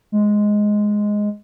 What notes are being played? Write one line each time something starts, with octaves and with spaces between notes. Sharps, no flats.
G#3